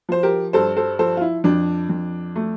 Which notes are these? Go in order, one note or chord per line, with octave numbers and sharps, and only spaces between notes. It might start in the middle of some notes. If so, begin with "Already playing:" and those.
F3 C5
G4 A#4
G2 A4 C5
A4 C5
F3 A4 C5
F4
E4
F2 D4
F2
A3